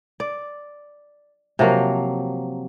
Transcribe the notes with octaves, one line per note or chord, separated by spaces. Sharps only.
D5
C3 F3 F#3 A#3